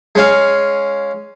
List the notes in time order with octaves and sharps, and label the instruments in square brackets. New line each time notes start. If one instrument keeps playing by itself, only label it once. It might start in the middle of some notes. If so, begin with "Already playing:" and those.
[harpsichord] G#3 C#4 F5